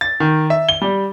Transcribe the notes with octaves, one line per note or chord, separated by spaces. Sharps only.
A6
D#3
E5
G7
G3